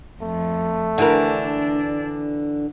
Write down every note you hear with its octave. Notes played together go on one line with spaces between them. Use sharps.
F2 A3
D3 E3 D4 A#4